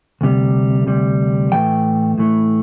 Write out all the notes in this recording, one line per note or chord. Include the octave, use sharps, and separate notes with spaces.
D2 C3 G3
D2 C3 G3
A2 E3 A3 G5
A2 E3 A3